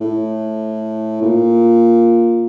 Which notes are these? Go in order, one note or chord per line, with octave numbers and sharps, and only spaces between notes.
A2
A#2